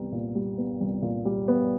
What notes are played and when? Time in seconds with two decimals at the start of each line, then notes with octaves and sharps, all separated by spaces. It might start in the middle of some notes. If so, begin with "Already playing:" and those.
Already playing: C2 G3 B3
0.12 A#2
0.35 G3
0.58 B3
0.81 C2
1.02 A#2
1.25 G3
1.48 B3